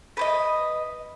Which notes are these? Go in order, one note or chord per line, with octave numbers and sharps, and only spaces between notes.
B4 C5 D#5